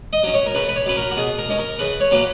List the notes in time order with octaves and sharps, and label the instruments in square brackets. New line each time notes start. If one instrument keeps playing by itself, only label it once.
[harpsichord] D#5
F#3 C#4
C#5
A#4
C#3 B4
B4
C#5
F#3 C#4 B4
A#4
F#4
B2 G#4
A#4
G#3 C#4
A#4
C#3 B4
C#5
F#3 A#3 C#4 B4